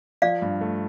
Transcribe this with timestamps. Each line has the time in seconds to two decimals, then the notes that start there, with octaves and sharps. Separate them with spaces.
0.22 F3 D5 F5
0.42 G2
0.61 A3